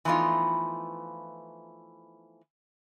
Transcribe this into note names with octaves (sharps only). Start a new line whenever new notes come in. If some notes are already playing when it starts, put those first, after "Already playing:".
E3 F3 A3 B3 D#4 F4